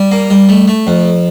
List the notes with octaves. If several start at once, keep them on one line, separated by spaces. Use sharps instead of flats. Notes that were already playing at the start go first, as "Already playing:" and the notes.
Already playing: G3
A#3
G3
A3
A3
F2